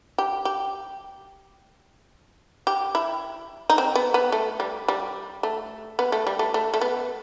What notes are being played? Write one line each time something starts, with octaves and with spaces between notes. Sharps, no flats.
G4
G4
G4
E4
D#4
C4
B3
B3
A3
G3
G3
A3
B3
A3
G3
A3
A3
A3
B3